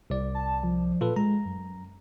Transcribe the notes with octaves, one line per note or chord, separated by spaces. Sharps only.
C2 D5
A5
F3
A#2 F4 A4 B4
G#3 A#5
F#2